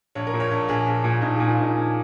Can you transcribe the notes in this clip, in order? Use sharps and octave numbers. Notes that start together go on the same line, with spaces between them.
A#1 C#5
A#4
A#2
C#5
A#1
A#1 G#4
A#1
A#2
A#1 D#4
A#2 G#4
F4
A#1 D#4
A#1 C#4